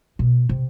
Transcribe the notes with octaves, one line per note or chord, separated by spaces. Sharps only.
B2
C3